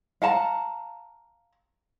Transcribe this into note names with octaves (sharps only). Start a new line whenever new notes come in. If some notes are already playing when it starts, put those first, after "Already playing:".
F5 F#5 A5 A#5